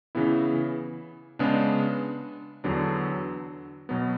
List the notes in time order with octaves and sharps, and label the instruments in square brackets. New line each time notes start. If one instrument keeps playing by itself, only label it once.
[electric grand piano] C#3 E3 B3 E4
C#3 G#3 B3 D4
E2 D3 F#3 B3 D4
B2 F#3 B3